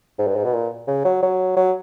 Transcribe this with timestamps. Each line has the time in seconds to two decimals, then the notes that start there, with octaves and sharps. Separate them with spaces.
0.19 G#2
0.27 G2
0.36 G#2
0.44 B2
0.53 A#2
0.87 C#3
1.05 F#3
1.23 F#3
1.57 F#3